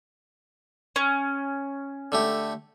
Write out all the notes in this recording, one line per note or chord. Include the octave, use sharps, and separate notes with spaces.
C#4
D3 A3 G4